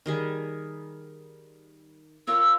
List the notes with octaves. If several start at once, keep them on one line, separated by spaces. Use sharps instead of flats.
D#3 G3 G#4
F4 A#4 C#5 E6